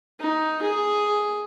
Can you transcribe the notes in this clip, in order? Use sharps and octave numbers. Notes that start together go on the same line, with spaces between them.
D#4
G#4